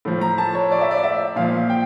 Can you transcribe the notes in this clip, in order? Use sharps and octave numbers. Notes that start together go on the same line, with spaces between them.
A2 F3
A#5
A5
C#5
D5
E5
D5
E5
A#2 F3 F5
G5